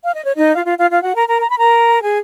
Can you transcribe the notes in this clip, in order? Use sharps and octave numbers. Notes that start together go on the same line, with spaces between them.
F5
D#5
C#5
D#4 D#5
F4 F5
F4 F5
F4 F5
F4 F5
F#4 F#5
A#4 A#5
A#4 A#5
A#5
B5
A#4 A#5
G#4 G#5